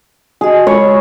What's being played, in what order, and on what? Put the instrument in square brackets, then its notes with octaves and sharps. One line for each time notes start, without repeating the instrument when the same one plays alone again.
[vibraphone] F#4 D#5 [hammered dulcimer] G#4
[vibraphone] G#3 F4 B5 [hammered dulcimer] C#5